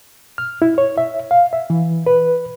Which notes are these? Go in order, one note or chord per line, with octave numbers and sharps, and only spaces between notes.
F6
E4
C#5
E5
F5
E5
E3
B4